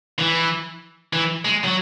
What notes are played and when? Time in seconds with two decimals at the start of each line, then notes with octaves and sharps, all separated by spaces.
0.19 E3
1.13 E3
1.45 G#3
1.64 F#3